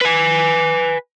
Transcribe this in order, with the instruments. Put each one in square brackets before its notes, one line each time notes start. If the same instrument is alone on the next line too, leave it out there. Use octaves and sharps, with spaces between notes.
[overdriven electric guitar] B4 G#5